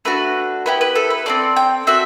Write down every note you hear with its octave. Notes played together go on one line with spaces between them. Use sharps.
A3 D4 F#4 B4
B3 E4 G4 B4
B4
A4
B4
C4 E4 A4 D5
G5
C4 F#4 A4 E5